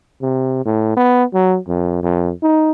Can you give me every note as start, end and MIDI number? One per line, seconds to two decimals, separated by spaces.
0.22 0.64 48
0.65 0.92 45
0.97 1.24 59
1.34 1.57 54
1.68 2.02 41
2.03 2.31 41
2.43 2.72 63